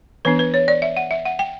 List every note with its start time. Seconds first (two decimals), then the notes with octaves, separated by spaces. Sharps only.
0.25 E3 B3 D4 B4
0.39 B4
0.54 C#5
0.68 D5
0.82 E5
0.97 F#5
1.11 E5
1.25 F#5
1.39 G5